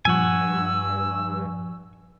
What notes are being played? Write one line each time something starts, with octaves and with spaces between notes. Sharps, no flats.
G2 A#2 F3 F#5 G#5 C#6 E6